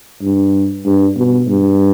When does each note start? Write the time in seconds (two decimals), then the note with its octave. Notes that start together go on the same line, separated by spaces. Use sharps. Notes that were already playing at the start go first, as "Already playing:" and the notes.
0.22 G2
0.85 G2
1.17 B2
1.48 G2